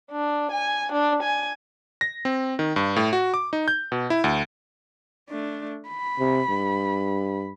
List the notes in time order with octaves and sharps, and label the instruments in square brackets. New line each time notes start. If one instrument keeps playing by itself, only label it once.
[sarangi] D4
G#5
D4
G#5
[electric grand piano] A#6
C4
D#3
G2
A2
F#4
D6
D#4
G6
B2
E4
D2
[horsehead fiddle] A3 D4
B5
[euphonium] C3
G2